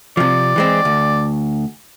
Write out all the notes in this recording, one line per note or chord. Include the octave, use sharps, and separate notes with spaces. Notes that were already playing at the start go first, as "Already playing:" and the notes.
C3 F3 D5
E3 G#3 C4
D2